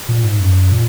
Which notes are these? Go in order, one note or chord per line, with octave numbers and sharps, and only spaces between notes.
A#2
G#2
F#2
A#2